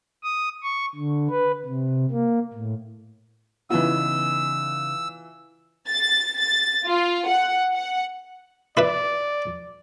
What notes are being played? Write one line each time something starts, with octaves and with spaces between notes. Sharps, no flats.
D#6
C#6
D3
B4
C3
A#3
A2
C#3 E3 B3 D#4 F4 E6
A6
A6
F4
F#5
F#5
E4 B4 D5 E5